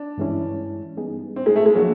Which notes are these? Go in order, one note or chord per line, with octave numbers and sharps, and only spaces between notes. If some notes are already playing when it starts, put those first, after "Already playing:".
Already playing: D4
G2 E3 G#3 C#4 E4
G3 B3 D#4 G#4
C4
G#3
A3
G#3
F3 F#3 A#3 D4